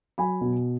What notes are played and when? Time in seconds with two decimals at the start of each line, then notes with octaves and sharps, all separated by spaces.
0.18 F#3 G#5 B5
0.41 B2